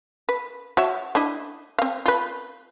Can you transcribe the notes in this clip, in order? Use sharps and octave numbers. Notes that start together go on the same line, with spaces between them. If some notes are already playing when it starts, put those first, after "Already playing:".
B4
F#4 C#5 E5
D4 E4 D#5
C4 F5
F4 B4